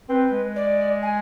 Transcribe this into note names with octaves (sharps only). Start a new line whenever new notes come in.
C4 B4
G#3
D5
G#5